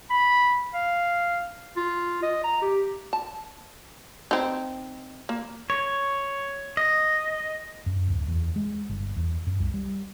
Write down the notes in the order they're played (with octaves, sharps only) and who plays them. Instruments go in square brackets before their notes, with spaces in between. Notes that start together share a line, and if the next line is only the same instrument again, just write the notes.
[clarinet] B5
F5
F4
D#5
A#5
G4
[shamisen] A5
C4 D#4
A#3
[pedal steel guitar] C#5
D#5
[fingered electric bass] F#2
D1
E2
G#3
G1
E2
F#2
C2
G3